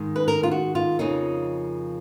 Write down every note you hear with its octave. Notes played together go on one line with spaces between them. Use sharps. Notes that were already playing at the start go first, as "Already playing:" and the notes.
Already playing: G#2 D#3 G#3
B4
A#4
F4
F#4
F4
F2 C#3 F3 A#3 D#4